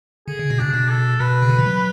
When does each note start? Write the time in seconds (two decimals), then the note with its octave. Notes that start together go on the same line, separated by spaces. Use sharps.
0.28 D3 G#4
0.39 C#3
0.50 B2
0.59 C#3 D4
0.74 B2
0.90 A4
1.19 B2 B4
1.42 C#3
1.49 D3
1.59 E3
1.66 F#3